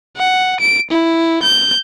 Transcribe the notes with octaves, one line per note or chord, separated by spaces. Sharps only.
F#5
D7
E4
G6